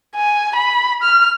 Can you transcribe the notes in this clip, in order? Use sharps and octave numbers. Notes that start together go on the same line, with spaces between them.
G#5
B5
F6